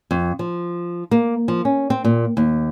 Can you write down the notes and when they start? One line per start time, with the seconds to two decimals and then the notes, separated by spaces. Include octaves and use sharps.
0.11 F2
0.39 F3
1.11 A#3
1.48 F3
1.65 C#4
1.90 C4
2.04 A#2
2.37 D#2